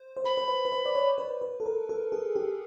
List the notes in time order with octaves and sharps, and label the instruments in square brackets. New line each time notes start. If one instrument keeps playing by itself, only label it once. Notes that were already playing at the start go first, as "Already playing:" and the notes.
Already playing: [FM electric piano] C5
C5
[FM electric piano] B4 [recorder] B5
[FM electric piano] B4
C5
B4
C5
D5
C#5
B4
B4
A4
A#4
A4
G#4
G4